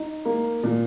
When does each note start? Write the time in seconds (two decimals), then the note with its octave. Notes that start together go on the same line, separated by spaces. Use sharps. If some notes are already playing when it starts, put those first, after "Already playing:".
Already playing: D#4
0.25 A#3
0.63 A#2